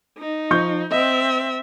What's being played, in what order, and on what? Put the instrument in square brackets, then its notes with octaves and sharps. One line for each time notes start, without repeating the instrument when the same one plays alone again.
[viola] D#4
[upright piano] F3 C#6 G6
[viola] C4 E5 [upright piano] D#5